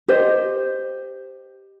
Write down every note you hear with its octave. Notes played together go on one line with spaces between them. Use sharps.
G4 C5 D#5